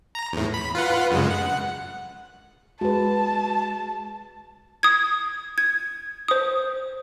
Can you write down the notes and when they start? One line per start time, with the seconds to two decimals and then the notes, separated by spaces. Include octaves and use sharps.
0.15 A#5
0.33 E2 A2
0.54 B5
0.75 F4 B4 F#5
1.11 F#2 C#3 G#3
1.31 F#5
2.81 G#3 F#4 B4 A5
4.83 D#6 G#6
5.58 G#6
6.28 C5 D#6